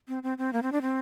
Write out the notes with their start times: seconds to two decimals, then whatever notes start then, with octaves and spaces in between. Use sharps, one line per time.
0.08 C4
0.23 C4
0.38 C4
0.53 A#3
0.63 C4
0.72 D4
0.82 C4